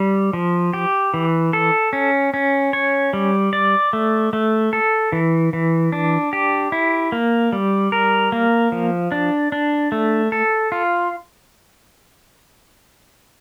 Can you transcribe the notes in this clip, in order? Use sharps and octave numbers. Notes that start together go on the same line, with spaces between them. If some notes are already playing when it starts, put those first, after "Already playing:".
Already playing: G3
F3
G4
E3
A4
C#4
C#4
C#5
G3
D5
A3
A3
A4
E3
E3
D4
G4
E4
A#3
G3
A#4
A#3
F3
D4
D4
A3
A4
F4